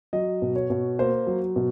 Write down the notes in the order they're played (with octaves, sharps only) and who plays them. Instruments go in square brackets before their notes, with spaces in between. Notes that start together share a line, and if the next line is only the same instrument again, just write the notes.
[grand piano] F#3 D#5
B2
C#5
B2
A#3 C5
F#3
B2